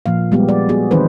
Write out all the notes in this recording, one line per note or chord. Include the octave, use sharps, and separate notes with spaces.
A#2 F3 A#3 F5
G3 G#3 B3 G4
D5
B3 F#4 G#4
D#3 E3 C4 D#4 B4 C5